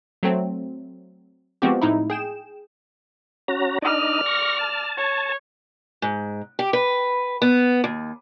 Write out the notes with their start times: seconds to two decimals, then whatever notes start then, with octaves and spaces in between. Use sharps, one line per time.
0.23 F#3 A3 C4
1.62 F3 G#3 B3 C4 F#4 G4
1.81 A2 D#4 E4
2.10 G#4 G5 E7
3.48 C#4 F#4 A#5
3.82 D4 D#4 D5 D#5 F6
4.26 C#6 A#6
4.59 A5
4.97 C#5
6.02 G#2
6.59 G4
6.73 B4
7.42 B3
7.84 D#2